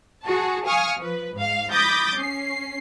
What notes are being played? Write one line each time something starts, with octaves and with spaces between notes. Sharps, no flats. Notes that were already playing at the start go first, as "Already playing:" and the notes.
F#4 G#4 A5
F5 G#5 C#6 D#6 F6
F3 B4
G#2 F5
B5 D6 D#6 G6 A6 A#6
C#4 C7